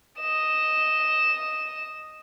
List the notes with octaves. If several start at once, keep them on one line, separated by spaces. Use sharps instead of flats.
D#5 E7